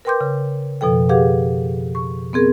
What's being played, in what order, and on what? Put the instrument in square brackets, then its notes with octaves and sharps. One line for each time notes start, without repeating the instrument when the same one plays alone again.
[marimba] A#4 B4 G5 C6 D6 G6
C#3
F2 B2 F3 A4 G5
G4 G#4 B4 F5 F#5 D6
C#6
B3 C4 G#4 A#4